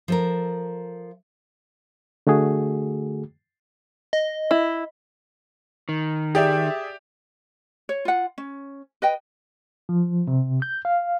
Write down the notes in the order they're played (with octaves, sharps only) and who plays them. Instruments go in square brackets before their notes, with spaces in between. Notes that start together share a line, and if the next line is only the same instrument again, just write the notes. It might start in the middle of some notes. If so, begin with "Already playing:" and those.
[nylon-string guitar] F3 A4 A#4
[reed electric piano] D3 A3 F#4 G#4
[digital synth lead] D#5
[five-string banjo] E4
[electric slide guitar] D#3
[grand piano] G4 [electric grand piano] G#4 D5 E5
[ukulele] C#5
F4 F#5
C#4
B4 D#5 G5
[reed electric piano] F3
C3
G6
F5